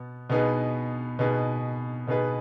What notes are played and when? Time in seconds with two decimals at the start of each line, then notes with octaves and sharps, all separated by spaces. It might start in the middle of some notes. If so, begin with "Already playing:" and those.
Already playing: B2 B3
0.30 B2 B3 D#4 G#4 B4
1.19 B2 B3 D#4 G#4 B4
2.07 B2 B3 D#4 G#4 B4